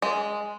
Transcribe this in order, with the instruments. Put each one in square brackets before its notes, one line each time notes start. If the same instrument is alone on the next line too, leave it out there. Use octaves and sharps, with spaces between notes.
[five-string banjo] G#3